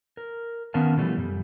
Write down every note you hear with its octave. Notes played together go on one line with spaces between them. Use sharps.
A#4
D#3 B3 C#4 A#4 F5 A5
B2 E3 F3 G3 A3
F#2 G3